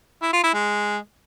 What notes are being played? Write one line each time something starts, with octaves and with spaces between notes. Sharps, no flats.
E4
F4
E4
G#3